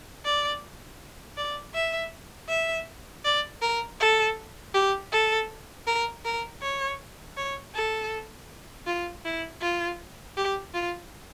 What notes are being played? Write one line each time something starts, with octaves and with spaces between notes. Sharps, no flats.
D5
D5
E5
E5
D5
A#4
A4
G4
A4
A#4
A#4
C#5
C#5
A4
F4
E4
F4
G4
F4